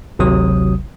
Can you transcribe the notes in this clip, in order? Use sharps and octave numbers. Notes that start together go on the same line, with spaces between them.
G#1 D2 C3 F#3 D#6